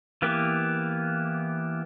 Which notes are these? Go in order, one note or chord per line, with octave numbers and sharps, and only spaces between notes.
E3 A#3 B3 G4